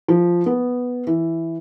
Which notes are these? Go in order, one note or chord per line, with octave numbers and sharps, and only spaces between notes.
F3
B3
E3